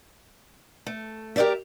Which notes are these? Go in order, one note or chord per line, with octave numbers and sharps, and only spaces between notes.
A3
G4 A#4 C5 D5 E5